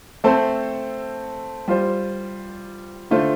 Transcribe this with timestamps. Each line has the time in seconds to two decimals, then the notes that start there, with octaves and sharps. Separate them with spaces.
0.24 A3 C4 A4 C5
1.68 G3 F4 C5
3.11 D3 A3 F4 C5